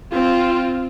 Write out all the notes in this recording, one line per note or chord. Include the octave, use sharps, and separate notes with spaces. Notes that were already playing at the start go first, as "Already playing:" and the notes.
C4 F4